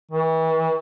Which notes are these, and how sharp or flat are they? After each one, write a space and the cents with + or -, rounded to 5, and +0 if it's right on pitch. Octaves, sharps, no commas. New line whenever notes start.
E3 -35